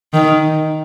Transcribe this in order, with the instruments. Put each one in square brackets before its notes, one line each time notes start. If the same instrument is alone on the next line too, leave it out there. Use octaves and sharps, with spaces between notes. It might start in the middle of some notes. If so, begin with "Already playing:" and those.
[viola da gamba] D#3